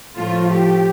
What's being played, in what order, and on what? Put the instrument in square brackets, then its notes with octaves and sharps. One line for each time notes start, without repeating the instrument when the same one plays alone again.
[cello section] A2 F3 A3 F4
G4